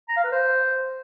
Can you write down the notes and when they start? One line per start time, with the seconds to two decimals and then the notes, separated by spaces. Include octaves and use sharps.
0.09 A#5
0.16 F5
0.24 B4
0.32 C5